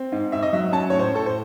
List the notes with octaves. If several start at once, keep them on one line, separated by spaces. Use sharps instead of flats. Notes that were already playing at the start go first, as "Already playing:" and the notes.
Already playing: C4
G#2
G#2 E5
D#5
F#3 E5
C#4 A5
A2 C#5
C5
A2 A4
C5